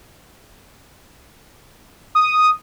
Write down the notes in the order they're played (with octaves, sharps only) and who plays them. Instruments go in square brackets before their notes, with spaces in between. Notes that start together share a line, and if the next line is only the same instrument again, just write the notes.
[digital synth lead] D#6